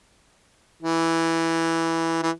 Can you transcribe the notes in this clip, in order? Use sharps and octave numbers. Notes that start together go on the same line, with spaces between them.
E3
E3